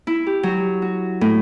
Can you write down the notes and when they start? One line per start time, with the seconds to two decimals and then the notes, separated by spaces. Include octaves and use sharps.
0.07 E4
0.27 G4
0.43 F#3
0.82 F#4
1.21 A2